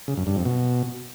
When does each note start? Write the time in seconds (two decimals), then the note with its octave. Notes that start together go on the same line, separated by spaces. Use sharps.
0.08 C#3
0.17 F#2
0.27 G2
0.36 F2
0.45 B2